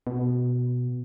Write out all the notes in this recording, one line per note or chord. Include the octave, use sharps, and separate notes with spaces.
B2